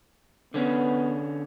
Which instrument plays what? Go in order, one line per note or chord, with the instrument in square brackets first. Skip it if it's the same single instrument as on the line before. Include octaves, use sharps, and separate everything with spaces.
[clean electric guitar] D3 C#4 [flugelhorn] B3